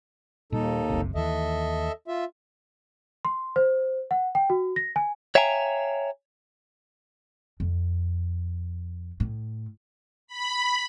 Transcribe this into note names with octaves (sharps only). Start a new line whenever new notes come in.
D#2 A#2 G3 D#4 A4
F#1 C2 C3
D#2 E3 A4 D#5 E5
F4 E5
C6
C5
F#5
G5
F#4
A#6
G#5
C#5 E5 F5 G5 G#5 A#5
F2
A2
B5